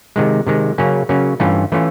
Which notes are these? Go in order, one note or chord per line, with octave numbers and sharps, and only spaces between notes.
C3 D#3 G#3
C3 D#3 G#3
C#3 F#3 A#3 C#4
C#3 F#3 A#3 C#4
G2 E3 A3 C#4 F4
E3 A3 C#4 F4